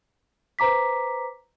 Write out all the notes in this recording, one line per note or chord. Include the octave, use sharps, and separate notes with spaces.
B4 C5 A#5 D6 B6